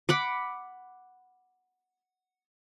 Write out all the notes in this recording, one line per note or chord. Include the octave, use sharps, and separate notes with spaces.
F#5 B5 D6